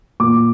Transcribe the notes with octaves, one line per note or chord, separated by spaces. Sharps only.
A#2 D6